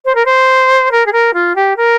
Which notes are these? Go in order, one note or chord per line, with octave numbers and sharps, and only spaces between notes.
C5
A#4
C5
A#4
G#4
A#4
F4
G4
A#4